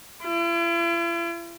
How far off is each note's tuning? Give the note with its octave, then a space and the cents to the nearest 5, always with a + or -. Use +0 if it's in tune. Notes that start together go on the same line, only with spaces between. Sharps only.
E4 +45